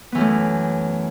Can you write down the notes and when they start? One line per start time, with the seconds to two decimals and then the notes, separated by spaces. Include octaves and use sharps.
0.12 B3
0.15 E3
0.18 F#2
0.21 A3